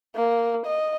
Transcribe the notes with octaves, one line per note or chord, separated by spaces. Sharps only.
A#3
D#5